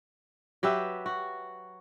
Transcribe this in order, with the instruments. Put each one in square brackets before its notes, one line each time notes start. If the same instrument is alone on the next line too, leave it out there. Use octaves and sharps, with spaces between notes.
[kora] F#3 G4 B4 E5
F#4